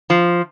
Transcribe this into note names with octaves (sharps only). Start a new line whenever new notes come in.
F3